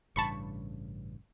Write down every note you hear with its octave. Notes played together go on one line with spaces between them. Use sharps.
A1 G2 C#3 A5 B5 C#6